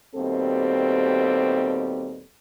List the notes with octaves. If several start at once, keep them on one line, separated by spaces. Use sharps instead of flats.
D#2 B2 G3 C4 A4